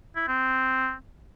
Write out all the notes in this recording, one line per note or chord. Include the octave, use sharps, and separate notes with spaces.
E4
C4